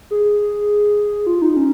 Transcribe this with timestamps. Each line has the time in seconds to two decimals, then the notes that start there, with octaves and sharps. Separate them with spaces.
0.11 G#4
1.27 F4
1.42 D#4
1.57 C#4